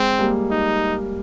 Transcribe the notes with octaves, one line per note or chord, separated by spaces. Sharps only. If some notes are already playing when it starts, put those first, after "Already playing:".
Already playing: G#3 C4
G3 A#3
D#4